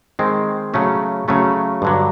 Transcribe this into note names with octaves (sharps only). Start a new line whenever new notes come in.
D#3 G#3 C4
C#3 F#3 A3 C#4
C#3 F#3 A3 C#4
G2 D3 F#3